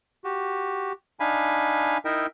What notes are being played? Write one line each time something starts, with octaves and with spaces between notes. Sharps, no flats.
F#4 G4
D4 D#4 F5 G#5 B5
D#4 E4 A#4 D#5 E5 G5